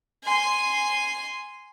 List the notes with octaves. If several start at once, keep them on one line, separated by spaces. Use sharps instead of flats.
G#5 C6